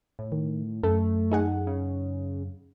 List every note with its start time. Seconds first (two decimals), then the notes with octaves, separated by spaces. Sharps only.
0.19 A2
0.32 D#3
0.83 F#2 A3 A4
1.31 D#4 G#4 F#5
1.67 C#3